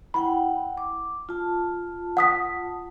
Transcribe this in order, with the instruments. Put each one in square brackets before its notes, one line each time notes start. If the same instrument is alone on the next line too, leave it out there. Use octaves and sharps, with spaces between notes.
[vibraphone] E4 F#5 G5 [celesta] B5
[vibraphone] D6
F4 A5
[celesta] F#5 D#6 B6